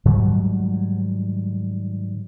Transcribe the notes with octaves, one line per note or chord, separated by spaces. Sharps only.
G#2 D#3 F#3 G3